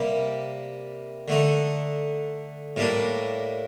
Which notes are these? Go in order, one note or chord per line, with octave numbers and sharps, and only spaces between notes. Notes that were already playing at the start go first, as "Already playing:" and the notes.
Already playing: C3 G3 A#3
D3 A3 D#4
A2 G3 A#3 D4